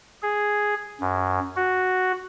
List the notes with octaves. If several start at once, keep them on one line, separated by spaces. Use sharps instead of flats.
G#4
F#2
F#4